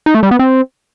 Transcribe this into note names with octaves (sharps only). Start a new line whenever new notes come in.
D#4
A3
G3
B3
C4